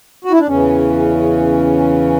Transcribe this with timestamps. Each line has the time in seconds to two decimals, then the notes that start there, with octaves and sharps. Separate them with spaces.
0.25 F#4
0.32 E4
0.40 D4
0.47 E2 C#3 E3 C#4